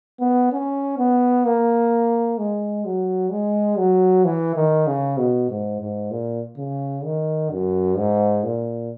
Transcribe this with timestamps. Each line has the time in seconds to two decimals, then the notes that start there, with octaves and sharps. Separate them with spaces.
0.21 B3
0.52 C#4
0.98 B3
1.45 A#3
2.38 G#3
2.85 F#3
3.31 G#3
3.78 F#3
4.25 E3
4.56 D#3
4.87 C#3
5.18 B2
5.49 G#2
5.81 G#2
6.11 A#2
6.58 C#3
7.04 D#3
7.51 F#2
7.97 G#2
8.44 A#2